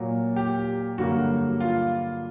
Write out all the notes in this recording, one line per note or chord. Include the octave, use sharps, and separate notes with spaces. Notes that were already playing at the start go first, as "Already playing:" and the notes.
Already playing: A#2 F#3 A#3
G4
G2 D3 F#3 A#3 F#4
F4